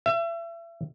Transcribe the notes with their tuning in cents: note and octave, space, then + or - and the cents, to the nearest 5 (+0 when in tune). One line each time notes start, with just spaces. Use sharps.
E5 +35